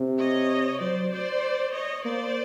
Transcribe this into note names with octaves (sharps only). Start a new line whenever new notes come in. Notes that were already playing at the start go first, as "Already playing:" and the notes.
Already playing: C3
C#5 D#5
F#3 C5 D5
C5 D5
C#5 D#5
A#3 C5 D5